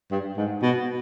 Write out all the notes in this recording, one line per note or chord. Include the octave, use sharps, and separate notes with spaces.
G2
G#2
B2